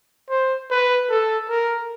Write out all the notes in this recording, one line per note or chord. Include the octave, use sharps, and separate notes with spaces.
C5
B4
A4
A#4